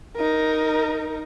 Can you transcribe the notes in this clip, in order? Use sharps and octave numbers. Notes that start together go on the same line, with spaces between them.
D#4 A#4